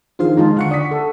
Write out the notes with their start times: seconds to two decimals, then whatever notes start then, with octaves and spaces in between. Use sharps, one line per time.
0.19 D#3 F3 F4 G#4 C5 F5
0.37 D#3 G#3 D#4 F4 A5
0.57 D3 F5 F#5 C#6 C#7
0.71 D5 D#6 B6
0.91 A4